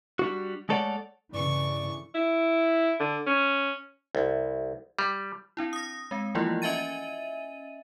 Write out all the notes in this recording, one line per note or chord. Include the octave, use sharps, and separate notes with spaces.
G3 D4 F#4
G#3 A3 A4 C#5 D5 F#5
G2 C#3 E3 A3 D5 C#6
E4
D3
C#4
C2
G3
C4 D4 E4
D#6 A#6
G#3 C4
E3 F3 A3 A#3 E4 F4
C#4 D#5 E5 G#5 A6 D#7